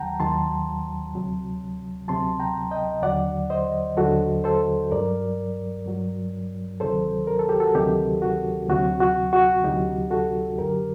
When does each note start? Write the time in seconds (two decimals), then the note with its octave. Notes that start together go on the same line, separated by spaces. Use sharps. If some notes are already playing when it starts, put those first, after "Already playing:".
Already playing: D#2 D#3 F#3 F#5 G5 A5 A#5
0.19 D#2 D#3 F#3 A5 C6
1.14 D2 C3 F#3
2.08 D2 C3 F#3 A5 C6
2.39 G5 A#5
2.71 D#5 G5
3.02 D#2 D3 F#3 D5 F#5
3.50 C5 D#5
3.97 D#2 D3 F#3 F#4 A4
4.44 A4 C5
4.91 G2 F#3 A#4 D5
5.86 G2 F#3
6.80 D2 C3 D#3 F#3 A4 C5
7.27 A#4
7.39 A4
7.49 G4
7.60 F#4 A4
7.75 D2 C3 D#3 F#3 D#4 G4
8.22 F#4
8.69 D2 C3 F#3 F#4
9.00 F#4
9.33 F#4
9.64 D2 C3 F#3 D#4 G4
10.11 F#4 A4
10.58 F#2 D3 F#3 G4 A#4